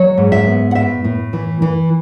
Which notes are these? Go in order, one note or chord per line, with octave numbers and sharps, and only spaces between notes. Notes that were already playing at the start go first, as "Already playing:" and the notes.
Already playing: F#3 C#5
G#2
E5
B3
F#5
A2 E5
A2
E3
E3